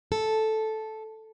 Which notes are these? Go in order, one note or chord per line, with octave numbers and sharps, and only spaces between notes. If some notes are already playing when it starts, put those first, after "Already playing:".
A4